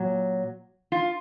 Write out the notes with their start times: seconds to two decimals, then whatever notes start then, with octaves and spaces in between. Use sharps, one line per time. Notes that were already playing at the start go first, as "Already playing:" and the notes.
Already playing: A#2 F#3
0.92 F4